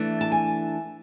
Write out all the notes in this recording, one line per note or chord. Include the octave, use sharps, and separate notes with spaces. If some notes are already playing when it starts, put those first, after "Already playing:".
Already playing: E3 A3 D4
A5
G#5